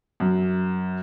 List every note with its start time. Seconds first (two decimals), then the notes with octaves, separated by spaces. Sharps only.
0.20 F#2